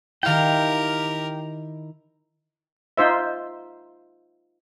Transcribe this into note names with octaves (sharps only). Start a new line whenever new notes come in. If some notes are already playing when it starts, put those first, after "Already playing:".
D#3 E4 G4 A#4 F5 G5
D#4 F4 C5 E5